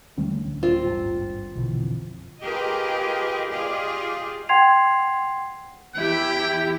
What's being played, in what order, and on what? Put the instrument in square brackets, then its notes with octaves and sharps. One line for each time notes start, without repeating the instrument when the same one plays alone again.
[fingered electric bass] D#2 D3 C#4 [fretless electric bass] D#3 G3 A3
[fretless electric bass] D1
[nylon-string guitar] C4 F4
[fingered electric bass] G#1 G2
[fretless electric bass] A#1 [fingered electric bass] B2 D3 E3
[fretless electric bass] F2
[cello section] F4 G4 G#4 A#4 B4 D#5
F4 G4 G#4 D5 D#5 F5
[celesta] F#5 G5 C6 G#6 C7 F7
[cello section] E2 E4 G4 [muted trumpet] G5